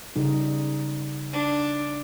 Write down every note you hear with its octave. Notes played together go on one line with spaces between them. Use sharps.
C#3 G3 D#4
D4